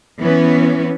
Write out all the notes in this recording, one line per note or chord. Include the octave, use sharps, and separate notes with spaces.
E3 B3 C#4